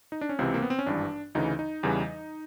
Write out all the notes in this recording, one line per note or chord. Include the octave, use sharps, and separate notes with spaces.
D#4
D4
C#4
C#2 C3 E3 C4
A#3
B3
C4
C#4
G#1 G2 E3 D4
D2 C#3 E3 D#4
D#4
E2 C#3 E3 G3